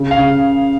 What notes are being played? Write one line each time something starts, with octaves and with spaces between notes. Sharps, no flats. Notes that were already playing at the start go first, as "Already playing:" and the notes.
Already playing: C#3
F5
C#3